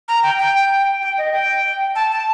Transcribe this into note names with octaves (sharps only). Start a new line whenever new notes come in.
A#5
G5
G5
G5
D#5
G5
A5
A5